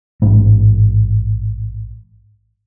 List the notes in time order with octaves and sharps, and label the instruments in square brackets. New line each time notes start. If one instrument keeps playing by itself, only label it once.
[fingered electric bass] A1 G#2 G#3